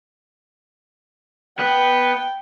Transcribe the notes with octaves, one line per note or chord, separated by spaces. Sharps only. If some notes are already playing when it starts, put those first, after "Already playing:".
B3 G5